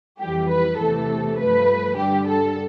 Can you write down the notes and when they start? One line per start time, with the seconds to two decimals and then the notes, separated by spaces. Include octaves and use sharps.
0.20 F2 E3 G3 G4
0.49 B4
0.79 E2 C3 E3 A3 A4
1.38 G2 F3 A3 B4
1.97 G2 D3 G3 G4
2.27 A4